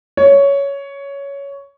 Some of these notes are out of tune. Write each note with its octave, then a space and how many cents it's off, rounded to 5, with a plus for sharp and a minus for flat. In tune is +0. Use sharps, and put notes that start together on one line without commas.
C#5 +10